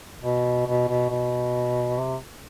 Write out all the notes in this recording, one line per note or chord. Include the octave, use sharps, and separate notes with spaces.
B2
B2
B2
B2
C3